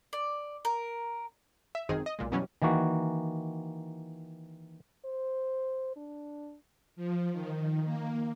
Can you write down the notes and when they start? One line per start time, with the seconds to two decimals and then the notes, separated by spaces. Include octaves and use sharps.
0.13 D5
0.65 A#4
1.75 E5
1.89 G#1 F#2 D#3 C4 D#4 G#4
2.06 D#5
2.19 B1 A#2 G#3
2.32 F#2 B2 E3 F#3 G3 C#4
2.62 D#3 E3 A#3 F#4
5.05 C5
5.96 D4
6.96 F3
7.32 D#3
7.85 A#3